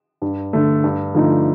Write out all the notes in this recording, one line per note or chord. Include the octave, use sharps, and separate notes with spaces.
G2
D3 A3
G2
D3 F3 A3 D#4